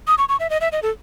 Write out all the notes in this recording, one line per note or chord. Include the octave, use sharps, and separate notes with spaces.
D#6
C#6
C#6
E5
D#5
E5
D#5
A4